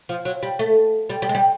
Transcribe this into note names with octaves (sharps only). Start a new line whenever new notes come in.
F3
F#3
G3
A3
G3
G3
G#3
G3